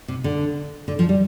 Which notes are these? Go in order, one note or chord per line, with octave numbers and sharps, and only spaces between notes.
C3
D3
D3
F3
G3